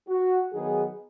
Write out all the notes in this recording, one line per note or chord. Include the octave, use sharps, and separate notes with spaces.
F#4
D#3 F#3 B3 D#4 G#4